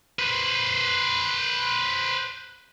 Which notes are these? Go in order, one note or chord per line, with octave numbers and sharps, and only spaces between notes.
B4 C5